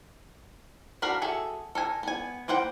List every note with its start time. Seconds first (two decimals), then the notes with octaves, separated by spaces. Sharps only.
1.02 D4 F#4 A#4 F5 B5
1.22 F#4 G#4 A4 E5
1.75 A4 A#4 G#5
2.03 B3 G#5
2.48 A#3 B4 C5 F#5 G5